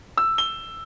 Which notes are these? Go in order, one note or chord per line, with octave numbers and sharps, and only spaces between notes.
E6
G7